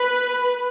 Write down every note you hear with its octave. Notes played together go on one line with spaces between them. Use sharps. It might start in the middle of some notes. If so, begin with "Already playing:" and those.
Already playing: B4